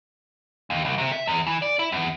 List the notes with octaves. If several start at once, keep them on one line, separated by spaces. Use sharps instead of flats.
D#2
C2
C3
E5
E2
E3
D5
E4
E2